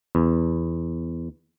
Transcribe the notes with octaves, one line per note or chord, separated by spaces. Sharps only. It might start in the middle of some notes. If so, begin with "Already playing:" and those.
E2